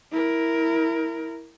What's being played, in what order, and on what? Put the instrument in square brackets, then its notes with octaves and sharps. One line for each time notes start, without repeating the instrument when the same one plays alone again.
[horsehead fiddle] E4 A#4